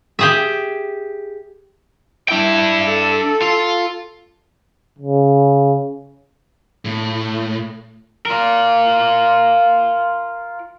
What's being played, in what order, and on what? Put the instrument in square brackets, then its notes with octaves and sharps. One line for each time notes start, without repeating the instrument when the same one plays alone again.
[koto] G4 G#4 E5
[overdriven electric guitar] D4 G5 [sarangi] E4
[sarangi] A4
[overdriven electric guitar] F4
[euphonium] C#3
[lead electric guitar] A2
[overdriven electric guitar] F4 A#4